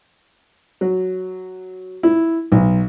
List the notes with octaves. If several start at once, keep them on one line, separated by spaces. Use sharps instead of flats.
F#3
E4
B1